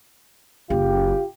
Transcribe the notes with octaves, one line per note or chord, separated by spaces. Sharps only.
F#1 F4 G4